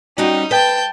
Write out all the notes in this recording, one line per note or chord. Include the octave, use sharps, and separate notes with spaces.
G3 C#4 D#4 F#4
B4 G5 A5 G6